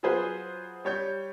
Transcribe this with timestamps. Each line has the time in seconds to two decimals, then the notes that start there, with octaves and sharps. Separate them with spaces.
0.03 F#3 F4 G#4 B4 C5
0.85 G3 C#5 G6